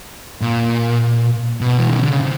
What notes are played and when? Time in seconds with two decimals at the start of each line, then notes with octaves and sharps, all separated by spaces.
0.41 A#2
1.61 B2
1.78 E3
1.88 D#3
1.98 D3
2.10 C#3
2.21 C3